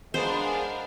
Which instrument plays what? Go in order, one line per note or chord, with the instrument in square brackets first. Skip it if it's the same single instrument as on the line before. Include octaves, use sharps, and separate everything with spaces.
[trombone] G#3 [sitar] B3 [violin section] D4 A#4 F5 [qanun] C5